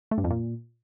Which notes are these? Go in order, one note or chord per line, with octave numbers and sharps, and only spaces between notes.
A3
G2
F2
A#2